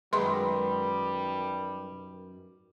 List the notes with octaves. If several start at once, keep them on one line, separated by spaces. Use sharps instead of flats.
F#2 D#3 G3 G#3 B4 B5 C6